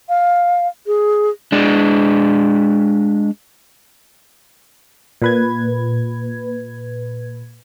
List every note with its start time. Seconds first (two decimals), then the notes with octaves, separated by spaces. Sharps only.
0.09 F5
0.87 G#4
1.52 G#3 D4
5.22 A#2 B4 G#6